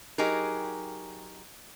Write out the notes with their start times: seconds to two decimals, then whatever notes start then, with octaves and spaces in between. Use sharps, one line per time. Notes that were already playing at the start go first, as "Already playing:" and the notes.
0.18 F#3 D#4 G4 G#4 A#4